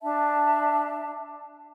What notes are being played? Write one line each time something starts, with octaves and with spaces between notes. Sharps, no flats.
D4 E5 A5